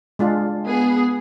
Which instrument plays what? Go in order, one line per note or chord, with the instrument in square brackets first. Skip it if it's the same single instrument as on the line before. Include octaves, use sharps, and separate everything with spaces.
[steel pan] G#3 D4 F4
[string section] B3 G#4